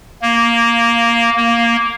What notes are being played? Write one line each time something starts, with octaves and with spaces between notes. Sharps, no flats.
A#3
A#3